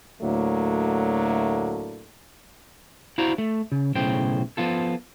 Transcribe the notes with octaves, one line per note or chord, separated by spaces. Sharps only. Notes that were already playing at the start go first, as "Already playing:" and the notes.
D2 A2 D3 F#3 A3 A#3
E4 F#4 C5 D5 F5 A#5
A3
C#3
B1 A2 C#3 C5 G5
F3 B3 F4 A4